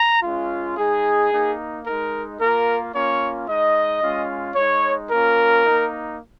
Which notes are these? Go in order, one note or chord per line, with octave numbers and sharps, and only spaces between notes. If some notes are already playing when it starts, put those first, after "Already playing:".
Already playing: A#5
G#3 C#4 F4
G#3 D#4 G#4
A#3 D#4
G#3 D#4 A#4
A#3 F4 A#4
A#3 C#4 F4 C#5
G#3 D#4 D#5
G#3 C#4 F4
G#3 D#4 C#5
A#3 C#4 F4 A#4
A#3 D#4